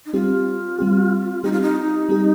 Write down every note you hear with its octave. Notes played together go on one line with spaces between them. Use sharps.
D#4
G3 C4 F4 G4
G3 C4 G4
G3 C4 D#4 G4
F4
D#4
G3 C4 G4